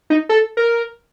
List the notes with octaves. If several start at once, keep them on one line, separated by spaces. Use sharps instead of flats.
D#4
A4
A#4